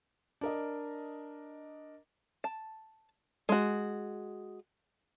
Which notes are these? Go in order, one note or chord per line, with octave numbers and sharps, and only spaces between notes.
D4 A#4 D#5
A5
G#3 F#4